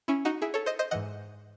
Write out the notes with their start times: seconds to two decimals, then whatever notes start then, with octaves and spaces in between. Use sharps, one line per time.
0.08 C#4 E4
0.25 D#4 F#4
0.42 E4 G#4
0.54 A4 C#5
0.66 C5 D#5
0.79 C5 D#5
0.91 G#2 E3 D#5 F#5